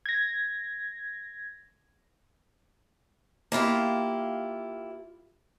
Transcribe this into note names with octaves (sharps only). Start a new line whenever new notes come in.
G#6 A#6
A#3 E4 F4 G4